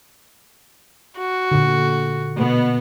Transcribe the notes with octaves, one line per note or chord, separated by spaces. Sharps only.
F#4
A#2 D3
B2 B3